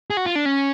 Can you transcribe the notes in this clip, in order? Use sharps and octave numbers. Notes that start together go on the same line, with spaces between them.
G#4
F#4
F4
D4
C#4